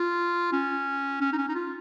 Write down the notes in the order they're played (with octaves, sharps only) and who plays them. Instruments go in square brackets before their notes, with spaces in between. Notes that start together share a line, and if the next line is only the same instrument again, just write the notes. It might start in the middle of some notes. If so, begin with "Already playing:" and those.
Already playing: [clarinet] F4
C#4
C#4
D#4
C#4
D#4
F4